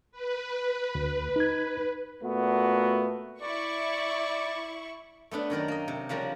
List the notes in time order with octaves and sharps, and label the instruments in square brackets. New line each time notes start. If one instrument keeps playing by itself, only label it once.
[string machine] B4
[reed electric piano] D2
D#4 G#6
[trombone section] A#2 A3 B3 F#4
[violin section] E4 C#6 [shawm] D5
[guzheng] A3 B3 D4 B4
F#2 D#3 A#4 D5
A#3 D#5
C3
C#3 F3 G3 D4 F#4 A#4